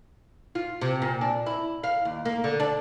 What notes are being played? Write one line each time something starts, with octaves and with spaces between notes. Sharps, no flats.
F4
C3
A#2
D4
E4
F5
D#2
A#3
D3
D4